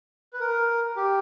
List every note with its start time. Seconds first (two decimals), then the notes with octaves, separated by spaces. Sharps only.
0.33 B4
0.40 A#4
0.96 G4